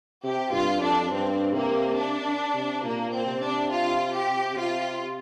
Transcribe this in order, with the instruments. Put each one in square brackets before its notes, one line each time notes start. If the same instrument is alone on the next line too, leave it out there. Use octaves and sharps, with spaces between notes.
[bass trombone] C3 [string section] G4
[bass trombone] G2 [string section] F4
[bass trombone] F2 [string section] D4
[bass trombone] G2 [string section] C4
[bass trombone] C3 [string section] A#3
[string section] D4
[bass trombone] C3
[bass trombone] A#2 [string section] A#3
[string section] C4
[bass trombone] C3
[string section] D4
F4
G4
[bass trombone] C3 [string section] F4